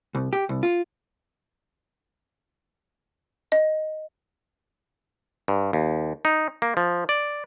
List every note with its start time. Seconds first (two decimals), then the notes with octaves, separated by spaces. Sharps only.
0.15 C2
0.33 G4
0.49 C2
0.63 F4
3.52 D#5
5.48 G2
5.73 D#2
6.25 D#4
6.62 A#3
6.77 F3
7.09 D5